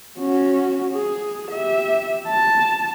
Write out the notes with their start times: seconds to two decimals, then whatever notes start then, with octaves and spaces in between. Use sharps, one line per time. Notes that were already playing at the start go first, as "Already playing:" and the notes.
0.19 C#4 F#4
0.93 G#4
1.51 G4 E5
2.28 A5